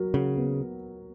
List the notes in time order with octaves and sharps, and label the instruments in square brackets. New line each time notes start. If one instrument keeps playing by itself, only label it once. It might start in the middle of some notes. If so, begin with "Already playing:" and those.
Already playing: [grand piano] F#3 A#4
[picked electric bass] C#3 [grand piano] F#4
[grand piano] B3